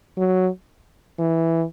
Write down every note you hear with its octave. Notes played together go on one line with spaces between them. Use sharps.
F#3
E3